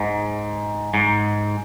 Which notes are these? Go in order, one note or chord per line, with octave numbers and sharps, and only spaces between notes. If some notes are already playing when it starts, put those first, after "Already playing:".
Already playing: G#2
G#2